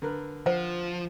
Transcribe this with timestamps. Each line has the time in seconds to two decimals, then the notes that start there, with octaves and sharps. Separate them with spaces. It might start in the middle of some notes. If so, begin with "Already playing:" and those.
0.02 D3 A#4 B4
0.46 F3 C5 F#5